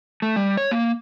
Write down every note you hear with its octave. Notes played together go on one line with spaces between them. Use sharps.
A3
G3
C#5
A#3